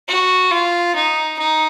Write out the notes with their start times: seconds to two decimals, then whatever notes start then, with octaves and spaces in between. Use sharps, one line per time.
0.08 F#4
0.51 F4
0.95 D#4
1.39 D#4